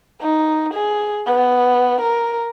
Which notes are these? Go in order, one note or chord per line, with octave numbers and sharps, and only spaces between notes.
D#4
G#4
B3
A#4